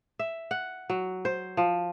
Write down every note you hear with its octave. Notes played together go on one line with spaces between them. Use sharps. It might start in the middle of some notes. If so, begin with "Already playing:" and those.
E5
F#5
F#3
C5
F3